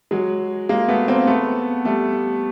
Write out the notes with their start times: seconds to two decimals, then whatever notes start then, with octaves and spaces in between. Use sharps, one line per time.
0.11 F#3 G#3
0.69 G#3 A#3
0.88 A3 B3
1.08 A#3 C4
1.27 A3 B3
1.85 G3 A3